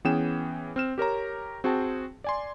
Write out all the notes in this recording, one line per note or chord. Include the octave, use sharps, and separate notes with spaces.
E3 B3 C#4 G#4 G5 E7
C4 F6 E7
G4 A#4 C#5 A#5
C4 F#4 G#4 G5 A5
D5 G#5 C6